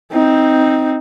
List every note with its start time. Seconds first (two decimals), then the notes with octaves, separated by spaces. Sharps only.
0.12 C4 D#4